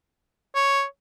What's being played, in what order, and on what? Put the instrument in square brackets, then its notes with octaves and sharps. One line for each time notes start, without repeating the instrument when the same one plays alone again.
[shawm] C#5